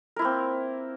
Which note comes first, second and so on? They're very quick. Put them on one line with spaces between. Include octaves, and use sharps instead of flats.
A#4 E4 A#3 C4